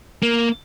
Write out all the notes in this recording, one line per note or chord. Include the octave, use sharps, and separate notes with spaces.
A#3